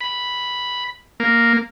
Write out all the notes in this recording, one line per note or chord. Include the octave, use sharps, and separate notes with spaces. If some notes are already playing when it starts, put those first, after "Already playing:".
B5
A#3